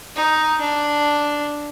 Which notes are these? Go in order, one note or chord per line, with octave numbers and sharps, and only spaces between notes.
D#4
D4